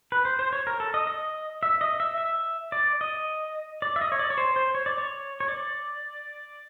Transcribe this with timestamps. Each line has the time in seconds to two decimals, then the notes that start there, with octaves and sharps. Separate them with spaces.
0.12 B4
0.25 C5
0.39 C5
0.53 C#5
0.67 A#4
0.80 A4
0.94 D#5
1.07 D#5
1.63 E5
1.81 D#5
2.00 E5
2.18 E5
2.72 D5
3.01 D#5
3.82 D5
3.96 E5
4.01 D#5
4.12 C#5
4.19 D5
4.30 C#5
4.38 C5
4.56 C5
4.75 C#5
4.86 D5
4.98 C#5
5.40 C#5
5.48 D5